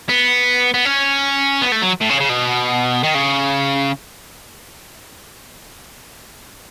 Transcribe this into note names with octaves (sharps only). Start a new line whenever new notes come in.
B3
B3
C#4
B3
A3
F#3
A2
C#3
C#3
B2
D#3
C#3